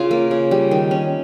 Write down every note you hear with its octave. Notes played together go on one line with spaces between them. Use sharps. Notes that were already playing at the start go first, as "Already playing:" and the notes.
Already playing: C#3 F4
A#3
C#3
G3
D#3
C#4